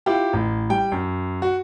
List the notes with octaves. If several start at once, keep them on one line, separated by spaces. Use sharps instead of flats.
E4 F4 G4
A1
G3 G5
F#2
F#4